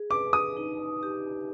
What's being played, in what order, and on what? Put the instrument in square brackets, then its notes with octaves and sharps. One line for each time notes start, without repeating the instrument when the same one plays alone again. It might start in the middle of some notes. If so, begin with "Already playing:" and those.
Already playing: [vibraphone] G#4
[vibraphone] B4 [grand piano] D6
[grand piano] D#6
[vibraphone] D#4
G4